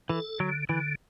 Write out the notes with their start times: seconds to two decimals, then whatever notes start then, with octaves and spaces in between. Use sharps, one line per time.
0.09 E3 A4
0.40 D3 F#3
0.69 D3 E3